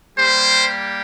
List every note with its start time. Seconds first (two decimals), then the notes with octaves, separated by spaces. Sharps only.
0.18 G3 A#3 G4 C5